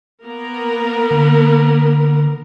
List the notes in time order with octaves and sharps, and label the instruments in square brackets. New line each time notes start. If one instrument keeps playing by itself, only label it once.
[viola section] A#3 B3 A#4
[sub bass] D3